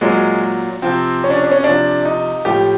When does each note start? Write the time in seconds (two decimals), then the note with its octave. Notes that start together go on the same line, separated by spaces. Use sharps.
0.01 A#2 F#3 G#3
0.82 C3 F3 C4
1.24 C#4
1.30 D4
1.38 C#4
1.44 D4
1.51 C#4
1.64 C3 F3 D4
2.05 D#4
2.45 A2 F3 G4